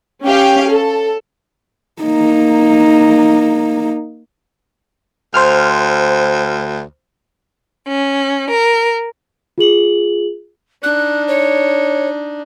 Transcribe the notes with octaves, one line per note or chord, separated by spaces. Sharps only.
C#4 G4 F5
A4
A#3 D#4
D2 C5 F6
C#4
A#4
F4 G#4 F#7
D4 D#4 F#6
C#5